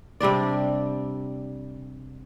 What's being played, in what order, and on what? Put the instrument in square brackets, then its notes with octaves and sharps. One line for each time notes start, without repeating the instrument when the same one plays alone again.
[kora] C3 G3 D4 D5